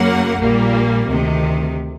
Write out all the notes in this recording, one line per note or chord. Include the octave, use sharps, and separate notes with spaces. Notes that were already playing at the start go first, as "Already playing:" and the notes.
Already playing: F#2 C#3 F#3 A#3 F#5
A#1 A#2 G3 A#3
D2 C3 D#3